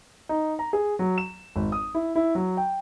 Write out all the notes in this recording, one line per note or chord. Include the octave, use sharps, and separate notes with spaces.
D#4
A#5
G#4
F#3
E7
G#1
D#6
E4
E4
F#3
G5